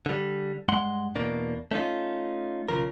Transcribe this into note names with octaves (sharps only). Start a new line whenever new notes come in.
D3 G3
G2 G#3 F#5 C6
E2 B2 A#3 D4
A3 C#4 D#4 F4
B1 C#3 F3 A#4